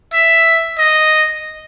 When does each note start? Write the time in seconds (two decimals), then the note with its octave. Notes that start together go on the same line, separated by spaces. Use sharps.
0.13 E5
0.78 D#5